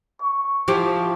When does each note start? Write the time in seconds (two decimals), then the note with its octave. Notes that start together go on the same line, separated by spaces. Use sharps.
0.22 C#6
0.68 F3 E4 G4